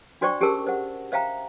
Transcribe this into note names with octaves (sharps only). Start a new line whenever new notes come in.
D4 F#4 C5 D5 G5 C#6
C#4 G4 G#4 A#4 A5 E6
C5 F#5
C5 E5 F5 G5 A#5